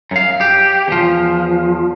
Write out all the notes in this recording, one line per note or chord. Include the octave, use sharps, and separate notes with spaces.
F#2 F5
G4
E2 F3